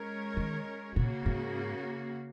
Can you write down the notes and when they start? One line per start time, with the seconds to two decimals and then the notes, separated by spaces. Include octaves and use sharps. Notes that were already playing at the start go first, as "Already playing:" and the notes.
Already playing: G#3 C#4 A#4 C#5
0.37 D#3
0.96 A#2 C#3 A#3 F#4
1.26 G#2